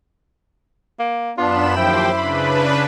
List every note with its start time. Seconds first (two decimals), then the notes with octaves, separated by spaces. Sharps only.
0.99 A#3
1.38 F#2 B3 D4 F4 B5 E7
1.76 D#2 F3 E4 C5 G5 C6 D6
2.17 C#3 D4 B4 B5